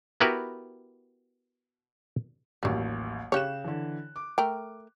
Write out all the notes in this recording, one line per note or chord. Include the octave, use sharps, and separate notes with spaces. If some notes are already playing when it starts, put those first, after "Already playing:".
B3 E4 F#4 G4 A#4 B4
A1 D#2 F#3 G3
C#3 G4 C#5 F#6 E7
D3 E3
D6
A3 A#4 G5